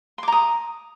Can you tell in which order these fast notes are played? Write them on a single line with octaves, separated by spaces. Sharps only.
C6 D6 A#5 D#6